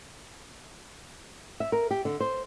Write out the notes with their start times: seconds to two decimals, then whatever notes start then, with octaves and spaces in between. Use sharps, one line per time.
1.60 E5
1.72 A#4
1.91 G4
2.05 D3
2.20 C5